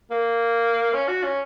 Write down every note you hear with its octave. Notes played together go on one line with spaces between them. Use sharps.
A#3
C#4
F#4
C#4